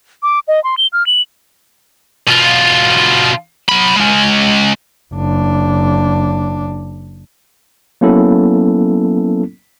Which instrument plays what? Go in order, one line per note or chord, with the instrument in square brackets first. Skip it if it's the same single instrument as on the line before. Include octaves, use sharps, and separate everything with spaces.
[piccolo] D6
D#5
C6
G7
F6
F#7
[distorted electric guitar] B2 F4
F#3 B5
G#3 C#4
[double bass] F#1 D4
[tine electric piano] F#3 A#3 B3 C#4 E4 A4